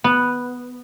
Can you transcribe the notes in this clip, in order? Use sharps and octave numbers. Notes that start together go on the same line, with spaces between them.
B3